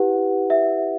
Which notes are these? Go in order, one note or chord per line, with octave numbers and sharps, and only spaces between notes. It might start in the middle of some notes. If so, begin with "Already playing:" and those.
Already playing: E4 G4 B4 F#5
E5